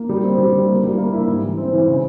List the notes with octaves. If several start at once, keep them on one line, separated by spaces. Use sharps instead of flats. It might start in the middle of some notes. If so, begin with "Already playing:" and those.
Already playing: A#3
G3
C4
G3
G3
A#3
G3
A#3
E4
G#2
E3
C4
E3
C#3